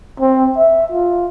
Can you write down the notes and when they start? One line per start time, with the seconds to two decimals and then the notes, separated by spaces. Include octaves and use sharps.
0.20 C4
0.57 E5
0.92 F4